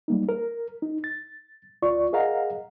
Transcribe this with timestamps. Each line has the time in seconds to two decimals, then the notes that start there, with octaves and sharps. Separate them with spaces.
0.08 G3 A#3 D#4
0.29 A#4
0.82 D#4
1.04 A6
1.82 D2 F4 D5 C#6
2.13 G#4 A#4 D#5 F5 F#5 A#5